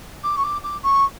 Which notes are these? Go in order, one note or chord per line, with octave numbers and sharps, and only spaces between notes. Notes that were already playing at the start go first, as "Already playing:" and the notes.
D6
C#6
D6
D6
C#6